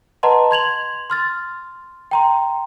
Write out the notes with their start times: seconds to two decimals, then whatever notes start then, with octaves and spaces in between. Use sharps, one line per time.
0.23 B4 D#5 F#5 A5 A#5 C6
0.51 C6 G#6 F7 F#7
1.10 C6 F6 A6
2.11 G5 A#5 C6